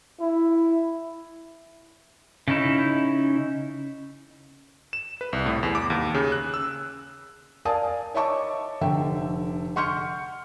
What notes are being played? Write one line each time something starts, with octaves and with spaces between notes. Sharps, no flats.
E4
C#3 C#4 D#4 E4
E7
B4
C2
A2
E2
D6
D#2
C#3
F#6
E6
A#4 D5 F5 G#5 A5 D#6
C#5 D#5 E5 A5 C#6 D6
F1 D3 E5 G5
F#5 C6 C#6 F6 G6 C#7